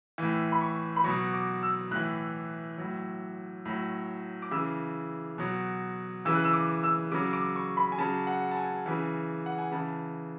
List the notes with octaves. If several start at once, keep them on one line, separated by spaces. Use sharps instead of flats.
A2 E3
B5
C#6
B5
B2 F#3 C#6
D6
E6
A2 E3 F#6
A2 F#3
A2 F#3
D6
C#3 E3 E6
B2 F#3
C#3 E3 E6
F#6
E6
D6
E6
C#3 F#3 D6
D6
C#6
B5
G#5
C#3 F#3 A5
F#5
A5
G#5
C#3 E3
F#5
G#5
C#3 E3 A5